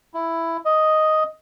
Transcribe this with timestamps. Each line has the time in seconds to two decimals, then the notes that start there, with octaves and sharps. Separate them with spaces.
0.14 E4
0.65 D#5